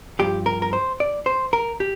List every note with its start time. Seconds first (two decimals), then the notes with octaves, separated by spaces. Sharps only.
0.19 G2 F3 G4
0.46 A#4
0.62 A#4
0.73 C5
1.00 D5
1.26 C5
1.53 A#4
1.80 G4